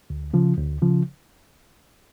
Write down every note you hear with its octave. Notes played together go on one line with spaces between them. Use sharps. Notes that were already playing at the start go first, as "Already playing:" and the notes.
D2
C#3 F3
D2
C#3 F3